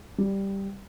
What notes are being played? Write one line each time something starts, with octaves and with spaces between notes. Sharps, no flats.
G3